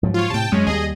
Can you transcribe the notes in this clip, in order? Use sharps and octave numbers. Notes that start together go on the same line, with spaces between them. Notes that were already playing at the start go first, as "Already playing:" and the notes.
G#2 F3 F#3
F4 C#5
A2 C3 G5 A5
F#2 G#3 C#4
D#2 F#3 G3 G#4 D#5